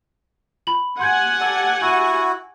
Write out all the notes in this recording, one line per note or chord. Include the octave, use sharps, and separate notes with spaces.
B5 F#7
G4 F#5 G#5 C6 G6 G#6
A4 D5
E4 F#4 F#6 D#7